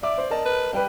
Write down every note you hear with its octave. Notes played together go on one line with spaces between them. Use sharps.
D5 E5 D6
C5
A#4 D#5 A5
B4
G3 G4 B4